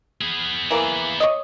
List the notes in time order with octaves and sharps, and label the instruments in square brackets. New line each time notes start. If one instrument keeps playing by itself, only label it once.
[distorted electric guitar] B3 G#4
[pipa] E3 A#3
C#5 D#5